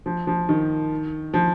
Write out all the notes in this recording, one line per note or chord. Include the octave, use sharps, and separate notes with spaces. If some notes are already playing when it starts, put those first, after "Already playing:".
F3
F3
D#3
F3